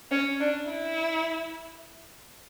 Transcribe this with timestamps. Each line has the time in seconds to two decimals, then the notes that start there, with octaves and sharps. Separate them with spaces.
0.11 C#4
0.40 D4
0.68 E4